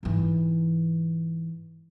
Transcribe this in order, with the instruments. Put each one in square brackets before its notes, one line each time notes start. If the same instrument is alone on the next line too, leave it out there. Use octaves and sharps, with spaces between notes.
[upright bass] G#2 E3